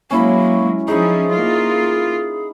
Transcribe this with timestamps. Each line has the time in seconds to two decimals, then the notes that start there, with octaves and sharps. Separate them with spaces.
0.11 F#3 G#3 A#3 C#4 E4 B5
0.88 F3 C#4 D#4 E4 G#4
1.31 A#3 F4